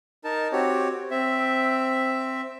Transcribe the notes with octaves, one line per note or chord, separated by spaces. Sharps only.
D#4 A#4 A5
C4 F#4 G4 C#5
C4 E5